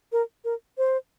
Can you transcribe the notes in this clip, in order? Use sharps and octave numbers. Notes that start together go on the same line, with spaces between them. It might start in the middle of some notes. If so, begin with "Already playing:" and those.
A#4
A#4
C5